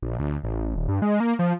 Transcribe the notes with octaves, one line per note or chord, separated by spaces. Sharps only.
A#1
D2
A1
D#1
G2
G#3
A#3
F3